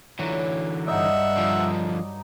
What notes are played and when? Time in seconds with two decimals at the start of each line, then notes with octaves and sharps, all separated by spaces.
0.19 D3 E3 F#3
0.87 G2 D#4 D5 E5 F#5
1.37 D3 F3